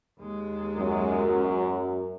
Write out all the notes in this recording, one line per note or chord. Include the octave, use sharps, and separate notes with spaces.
D#2 G#3
F#2